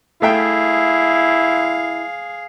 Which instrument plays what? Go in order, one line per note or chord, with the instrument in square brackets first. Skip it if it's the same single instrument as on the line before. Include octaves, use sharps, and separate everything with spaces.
[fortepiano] A3 E5 G5 [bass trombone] E4 [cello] G#4 F5